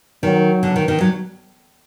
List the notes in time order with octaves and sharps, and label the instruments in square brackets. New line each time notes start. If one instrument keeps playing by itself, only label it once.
[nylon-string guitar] D#3 [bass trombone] F#3
[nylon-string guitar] D3
D#3
D#3
F#3